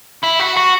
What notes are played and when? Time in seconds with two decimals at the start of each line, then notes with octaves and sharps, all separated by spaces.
0.24 E4
0.40 F#4
0.57 F#4